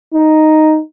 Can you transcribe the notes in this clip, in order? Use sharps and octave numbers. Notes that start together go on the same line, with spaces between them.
D#4